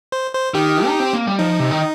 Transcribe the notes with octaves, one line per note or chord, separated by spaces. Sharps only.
C5
C5
D#3 G4
D#4
C4
A#3
G3
F3 D#4
C3
D#3